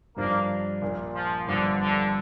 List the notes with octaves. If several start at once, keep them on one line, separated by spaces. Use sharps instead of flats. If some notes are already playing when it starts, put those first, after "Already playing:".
G2 F3 A#3 D4
A#1 A#2 A#3
F3
G1 G2 D3 F3
D3